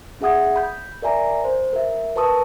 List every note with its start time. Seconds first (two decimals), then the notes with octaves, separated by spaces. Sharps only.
0.21 C#4 G#4 E5 F#5 D#6 G#6
0.56 B5 G6
1.02 A#4 D5 E5 G#5 A#5
1.44 C5
1.73 A#4 E5
2.16 A#4 B4 A5 C#6 D#6 E6